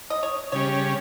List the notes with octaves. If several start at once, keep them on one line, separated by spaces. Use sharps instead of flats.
D#5
C#5
C#3 G3 C#4 C#5